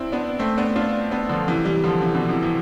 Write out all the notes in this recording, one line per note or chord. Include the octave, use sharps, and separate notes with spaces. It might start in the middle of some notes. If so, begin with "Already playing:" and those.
Already playing: C4 D4 E4
B3 D4
A3 C4
B3 D4
D4 F4
B3 D4
D3 F3
C3 E3
E3 G3
D3 F3
C3 E3
B2 D3
C3 E3
C3 E3